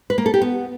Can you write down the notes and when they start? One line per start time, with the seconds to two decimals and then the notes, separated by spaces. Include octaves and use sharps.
0.10 B4
0.18 A#3
0.26 A4
0.34 G4
0.42 B3